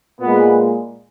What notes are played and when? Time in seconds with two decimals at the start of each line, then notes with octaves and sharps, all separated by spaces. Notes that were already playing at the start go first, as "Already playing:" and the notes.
0.20 A#2 G#3 B3